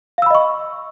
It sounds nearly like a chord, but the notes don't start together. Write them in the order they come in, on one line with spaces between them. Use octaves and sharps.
F5 E6 B5 D#5 C#6